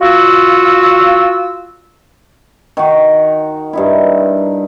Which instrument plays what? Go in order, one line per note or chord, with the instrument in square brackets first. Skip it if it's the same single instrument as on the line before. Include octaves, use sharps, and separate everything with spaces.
[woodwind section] F4 F#4 E6
[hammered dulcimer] D#3 F#4
G2 D#4 E4